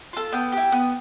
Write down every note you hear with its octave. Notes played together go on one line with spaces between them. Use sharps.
F4 A4
B3 G5
G4
E4
B3